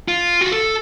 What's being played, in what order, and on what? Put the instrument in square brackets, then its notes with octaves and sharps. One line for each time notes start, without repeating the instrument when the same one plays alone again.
[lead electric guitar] F4
F#4
A4